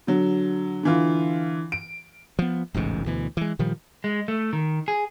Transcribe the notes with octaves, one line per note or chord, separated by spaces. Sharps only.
D3 F#3
D3 E3 F4
D7
F3 B3
E1 A1 G#2 C#3
D2 B2 E3
E3 G#3
A#2 D#3 F3 G3
G#3
A3
D#3
G#4